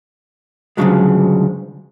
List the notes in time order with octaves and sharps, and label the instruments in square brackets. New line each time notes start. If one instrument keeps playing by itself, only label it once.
[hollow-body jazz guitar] D2 G2 C#3 F3 F#3 G#3